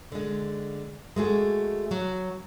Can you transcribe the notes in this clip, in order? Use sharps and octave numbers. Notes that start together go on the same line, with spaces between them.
D3 G#3
G#3 A3 F#4 G#4
F#3